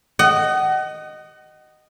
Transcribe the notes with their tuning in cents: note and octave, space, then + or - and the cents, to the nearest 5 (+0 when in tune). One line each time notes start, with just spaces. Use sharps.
D#5 -10 F#5 +35